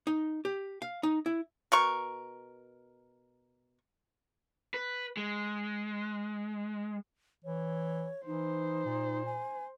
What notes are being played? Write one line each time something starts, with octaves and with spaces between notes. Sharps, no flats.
D#4
G4
F5
D#4
E4
B2 A#4 C#6
B4
G#3
E3 C#5
E3 D#4 C5
A#2
G#5